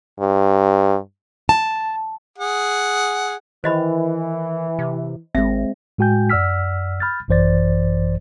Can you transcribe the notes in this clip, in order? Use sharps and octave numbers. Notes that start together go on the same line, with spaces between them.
G2
A5
G#4 F#5
D#3 E3 C5 D#5 B5
C3
G#1 G#3 C4 E5
A2 G#3 F#4 G5 G#5 G6
F#2 D5 F#5 E6 F6 B6
B5 F6 G6 A6
G#1 F#2 E3 C5 D5 A6